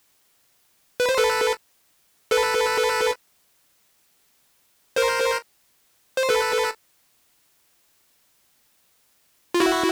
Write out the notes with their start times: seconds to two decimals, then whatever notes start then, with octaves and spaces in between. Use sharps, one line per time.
1.00 B4
1.09 C5
1.18 A4 B4
2.31 A4 B4
4.96 A#4 C5
6.17 C5
6.29 A4 B4
9.54 F4
9.60 E4 F#4